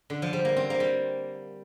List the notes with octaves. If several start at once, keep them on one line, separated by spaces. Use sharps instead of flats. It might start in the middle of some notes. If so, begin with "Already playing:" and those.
D3
F3
G3
A#3
C4
A#3
G3